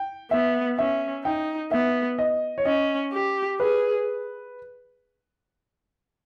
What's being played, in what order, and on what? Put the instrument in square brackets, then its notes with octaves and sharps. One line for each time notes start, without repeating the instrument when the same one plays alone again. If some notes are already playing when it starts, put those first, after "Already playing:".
Already playing: [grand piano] G5
[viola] B3 [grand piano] E5
[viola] C#4 [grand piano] E5
[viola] D#4 [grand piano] G5
[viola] B3 [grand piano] E5
[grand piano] D#5
C#5
[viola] C#4 [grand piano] D#5
[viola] G4
[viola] G#4 [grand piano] B4